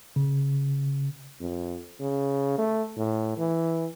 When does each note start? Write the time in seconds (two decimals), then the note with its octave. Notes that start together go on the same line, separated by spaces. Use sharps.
0.16 C#3
1.41 F2
2.00 C#3
2.58 A3
2.97 A2
3.37 E3